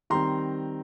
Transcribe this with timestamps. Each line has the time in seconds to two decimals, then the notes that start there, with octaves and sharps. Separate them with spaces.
0.10 D#3 G3 C4 A#5 C6